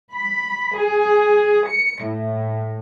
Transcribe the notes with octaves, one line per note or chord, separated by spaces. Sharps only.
B5
G#4
C#7
A2